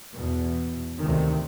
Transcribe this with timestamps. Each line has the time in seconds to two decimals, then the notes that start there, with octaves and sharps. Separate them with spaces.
0.14 E2 B2
1.01 D2 C3 D#3